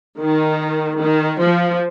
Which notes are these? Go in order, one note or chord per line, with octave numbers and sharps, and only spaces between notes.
D#3
D#3
F3